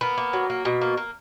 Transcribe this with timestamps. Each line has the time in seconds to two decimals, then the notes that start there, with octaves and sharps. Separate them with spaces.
0.01 A#3 B3
0.18 A#3
0.33 F#3
0.50 A#3
0.65 B2
0.81 A#3
0.97 A#3